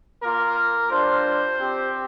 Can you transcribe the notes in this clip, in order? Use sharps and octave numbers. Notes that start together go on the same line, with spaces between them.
A#3 F4 A#4
G3 D4 F4 C5
C4 G4